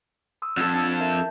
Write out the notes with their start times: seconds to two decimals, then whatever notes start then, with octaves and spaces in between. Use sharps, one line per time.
0.42 C6 D#6 E6
0.57 F2 A4 F#5 G#6
0.73 D4 A5
1.00 A#4 E5 A5
1.12 G6